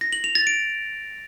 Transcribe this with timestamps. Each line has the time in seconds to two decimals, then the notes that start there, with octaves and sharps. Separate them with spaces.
0.01 A#6
0.13 F#7
0.24 F7
0.35 A6
0.47 D7